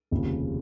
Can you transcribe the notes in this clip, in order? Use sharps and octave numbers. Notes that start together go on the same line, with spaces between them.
F1 D#2 C#3 F3